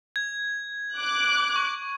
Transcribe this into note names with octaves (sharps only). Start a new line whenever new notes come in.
G#6
D6 F#6
C#6